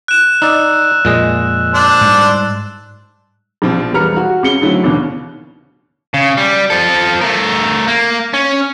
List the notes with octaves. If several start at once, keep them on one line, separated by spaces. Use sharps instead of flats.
F#6 E7
D#4 D5 E6
F2 A#2 G#3 D#5
D4 C5 D5
G#2 G3
A#1 B2 F3 C4
E1 G3 B4 A#5 F6 C#7
F#4
C#2 C#3 C#7 G7
D3 D#3 F#3 A3 C4 E4
A1 D#2 B2 D3
C#3
G3
F3 A4
A3 A#4
A#3
C#4